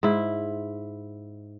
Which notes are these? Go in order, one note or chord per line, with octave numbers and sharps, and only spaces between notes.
G#2 E4